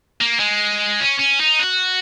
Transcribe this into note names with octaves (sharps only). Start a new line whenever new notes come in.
A#3
G#3
C#4
C#4
D#4
F#4